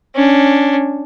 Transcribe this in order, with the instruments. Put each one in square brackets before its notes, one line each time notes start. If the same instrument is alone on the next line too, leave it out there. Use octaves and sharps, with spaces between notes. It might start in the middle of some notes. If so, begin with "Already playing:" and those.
[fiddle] C#4 D4